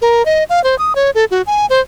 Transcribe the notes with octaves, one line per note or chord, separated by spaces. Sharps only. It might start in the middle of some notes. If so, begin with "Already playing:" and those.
A#4
D#5
F5
C5
D#6
C#5
A4
F#4
G#5
C5